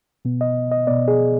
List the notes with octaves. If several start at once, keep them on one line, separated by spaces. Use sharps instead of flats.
B2 B3
D#5
D#5
B2 B3 D5
G#4